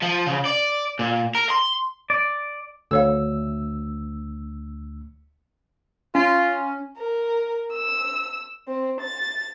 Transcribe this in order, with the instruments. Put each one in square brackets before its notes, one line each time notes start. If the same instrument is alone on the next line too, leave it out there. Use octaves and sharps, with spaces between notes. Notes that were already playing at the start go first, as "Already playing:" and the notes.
[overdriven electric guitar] F3
C#3
D5
A#2
A#4
C6
[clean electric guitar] D5
[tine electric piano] D2 E6 [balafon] A4 C#5 F5
[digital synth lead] C#4 [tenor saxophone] F4
[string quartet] A#4
E6
C4
A6